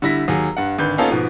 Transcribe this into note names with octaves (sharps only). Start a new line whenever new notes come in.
D3 G3 E4 A#6 B6
D#2 F#3 G#4
G2 F#5
G#1 D3 B4 G6
A#3 B3 C#4 D#4 F4 A4
G#2 B2 F3